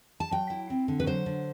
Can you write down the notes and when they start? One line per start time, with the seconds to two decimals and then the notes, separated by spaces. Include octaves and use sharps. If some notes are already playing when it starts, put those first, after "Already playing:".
0.20 A5
0.31 F#3 G5
0.50 E4
0.70 C4
0.88 D3
1.00 B4
1.06 F#3 C5
1.26 D3